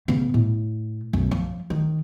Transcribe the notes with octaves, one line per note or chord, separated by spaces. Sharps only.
C#3 B3
A2
B1 F#2
F3
D#3